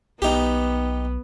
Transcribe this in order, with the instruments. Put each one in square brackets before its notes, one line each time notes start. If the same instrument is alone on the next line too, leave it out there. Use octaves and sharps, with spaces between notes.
[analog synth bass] B1 [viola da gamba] B3 [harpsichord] D#4 G4